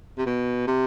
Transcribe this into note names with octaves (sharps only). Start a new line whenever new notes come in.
C3
B2
C3